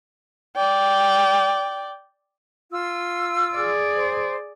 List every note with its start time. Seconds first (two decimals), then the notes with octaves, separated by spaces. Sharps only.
0.56 D5 G5
2.71 F4 E6
3.55 G#4 D5
3.96 C5